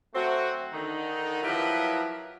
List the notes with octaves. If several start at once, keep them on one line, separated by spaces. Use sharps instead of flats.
F#3 A3 C4 F#4
D3 D#3 D#4
F3 F#3 E4 G4 A#4 B4